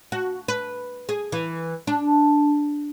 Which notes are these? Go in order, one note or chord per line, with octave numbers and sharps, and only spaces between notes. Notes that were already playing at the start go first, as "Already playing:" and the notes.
F#4
B4
G#4
E3
D4